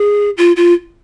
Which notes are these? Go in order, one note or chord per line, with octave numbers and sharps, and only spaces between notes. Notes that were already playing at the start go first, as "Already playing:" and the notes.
Already playing: G#4
F4
F4